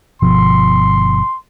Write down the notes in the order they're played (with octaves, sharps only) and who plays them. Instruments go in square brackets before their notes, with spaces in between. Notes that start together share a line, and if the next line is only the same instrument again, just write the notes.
[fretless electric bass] G1 B2 F3 [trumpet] C6